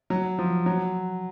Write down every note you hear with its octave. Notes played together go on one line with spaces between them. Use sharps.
F#3
F3
F#3